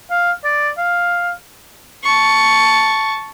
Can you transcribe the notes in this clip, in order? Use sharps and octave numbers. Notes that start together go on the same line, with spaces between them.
F5
D5
F5
A5 C#6